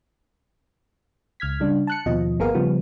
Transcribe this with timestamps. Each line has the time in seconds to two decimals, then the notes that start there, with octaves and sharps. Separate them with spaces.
1.40 C#2 F6 G#6 B6
1.60 C#3 G3 D4
1.87 A5 F#6 C#7
2.06 D#2 B2 F3 D#5
2.39 G1 A#3 B3 G#4 A#4 F5
2.54 C#3 F3 G3 B3